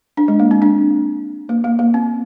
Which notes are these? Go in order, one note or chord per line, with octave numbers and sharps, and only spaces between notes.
D4
G#3
A#3
C4
D4
A#3
A#3
A#3
C4